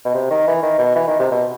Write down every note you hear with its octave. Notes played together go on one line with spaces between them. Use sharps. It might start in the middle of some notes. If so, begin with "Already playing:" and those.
B2
C3
D#3
E3
D#3
B2
E3
D#3
C3
B2